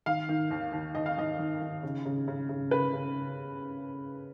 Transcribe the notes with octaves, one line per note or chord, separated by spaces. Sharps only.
D#3 F5
D#3
D#2
D#2
D#2 D#5
F5
D#3 D#5
D#3
D#3
C#3
C#3
C#3
C#3
C#3 B4
C#3